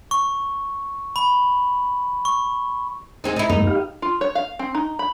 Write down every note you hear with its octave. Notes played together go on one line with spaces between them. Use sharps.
C#6
B5
C#6
G#3 C4 D#4
D#4 E4
F#2 G#3 A#3 D#4
G4 F5
F4
C#5
F5
C4
D#4
B5